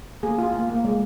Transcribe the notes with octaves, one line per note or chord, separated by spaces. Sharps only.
A#3 G#4
F4
A#3
A#3
G#3